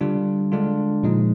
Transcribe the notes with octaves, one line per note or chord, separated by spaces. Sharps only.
D3 G3 D4 F4
D3 G#3 D4 F4
A#2 F3 G#3 D#4